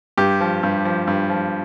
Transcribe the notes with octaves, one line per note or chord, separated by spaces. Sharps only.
G2 G4
F3
G2
F3
G2
F3